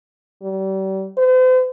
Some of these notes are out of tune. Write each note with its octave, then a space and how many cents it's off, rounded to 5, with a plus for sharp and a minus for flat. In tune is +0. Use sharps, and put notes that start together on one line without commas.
G3 -35
C5 -40